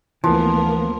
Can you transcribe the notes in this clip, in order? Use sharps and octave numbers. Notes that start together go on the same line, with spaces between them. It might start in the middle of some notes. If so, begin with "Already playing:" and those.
D2 E3 F3 A#3 B3 A#4